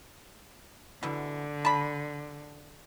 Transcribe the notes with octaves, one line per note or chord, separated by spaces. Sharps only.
B2 D3 E3
A5 B5